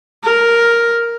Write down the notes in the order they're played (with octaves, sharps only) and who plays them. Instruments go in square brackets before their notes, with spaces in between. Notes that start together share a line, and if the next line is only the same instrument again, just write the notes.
[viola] A#4